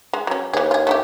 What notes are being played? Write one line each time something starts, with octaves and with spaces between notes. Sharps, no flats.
G#3
F#3 C#4
D#2 E3 G#4
F4 G#4
A3 F#4 G4